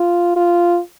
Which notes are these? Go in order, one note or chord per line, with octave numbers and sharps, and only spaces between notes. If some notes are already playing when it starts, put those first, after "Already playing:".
Already playing: F4
F4